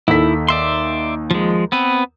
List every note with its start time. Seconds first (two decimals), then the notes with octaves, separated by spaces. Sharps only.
0.08 D#2 E4 A4 B6
0.48 D5 E5 C6
1.31 F3 G#3
1.72 B3 C4 B4